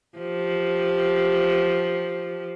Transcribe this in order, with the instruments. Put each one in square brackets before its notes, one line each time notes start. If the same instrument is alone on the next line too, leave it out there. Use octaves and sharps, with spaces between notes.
[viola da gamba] F3 G4